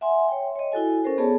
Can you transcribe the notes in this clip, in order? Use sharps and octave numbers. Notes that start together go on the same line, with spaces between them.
E5 F#5 G#5 C6
C#5 G5
C#5 D#5
E4 F#4 A4 G#5
C#4 A4 A#4 C5
B3 G#4 A4 C#5 D5 A5